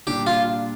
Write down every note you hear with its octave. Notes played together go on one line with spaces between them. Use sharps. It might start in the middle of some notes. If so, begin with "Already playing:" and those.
A#2 G3 D4 G4
F4